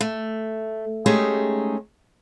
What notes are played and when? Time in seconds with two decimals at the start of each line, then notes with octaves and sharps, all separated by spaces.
0.01 A3
1.06 G#3 A3 C#4 D#4 G4 G#4